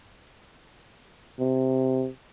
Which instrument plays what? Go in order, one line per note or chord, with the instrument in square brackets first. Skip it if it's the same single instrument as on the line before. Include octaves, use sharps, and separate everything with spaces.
[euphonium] C3